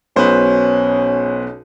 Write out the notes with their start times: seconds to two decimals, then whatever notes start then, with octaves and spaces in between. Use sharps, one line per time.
0.16 B1 B2 C#4 B4 C5